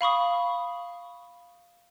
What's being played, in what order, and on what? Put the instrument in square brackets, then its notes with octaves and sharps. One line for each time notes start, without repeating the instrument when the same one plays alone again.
[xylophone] F5 B5 C#6 D#6